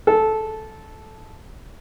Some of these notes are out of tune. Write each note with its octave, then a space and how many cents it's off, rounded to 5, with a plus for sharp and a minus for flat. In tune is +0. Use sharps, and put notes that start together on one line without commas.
A4 -10